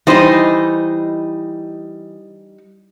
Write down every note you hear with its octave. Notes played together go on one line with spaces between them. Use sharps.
E3 G3 D#4 C5 D#5